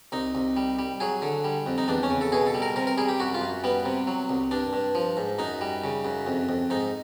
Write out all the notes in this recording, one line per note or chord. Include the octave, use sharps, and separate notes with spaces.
C2 D#4
C2
G3
G3
F#3 G#4
D3
G3
F2
D#4
E2 D4
C#4
C#3
A4
B2 G#4
A4
G3
A#4
C3 A#4
A#4
G3 G#4
G4
F#2 F#4
F4
F#2
G3 B3
C3
F#3
C2
G2 D4
G2
F3
G#2
F#2 D#4
G3
C#3
F#2
F2
F2
G#2 D#4